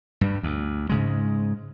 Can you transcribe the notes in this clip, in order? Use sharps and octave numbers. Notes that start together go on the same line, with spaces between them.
G2 G3
D2
G#2 C#3 G#3